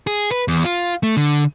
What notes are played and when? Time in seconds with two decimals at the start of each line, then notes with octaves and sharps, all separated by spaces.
0.07 G#4
0.31 B4
0.48 E2
0.65 F4
1.03 A3
1.17 D3